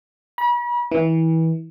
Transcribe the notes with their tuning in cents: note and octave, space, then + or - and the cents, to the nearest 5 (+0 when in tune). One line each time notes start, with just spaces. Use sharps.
B5 -40
E3 -25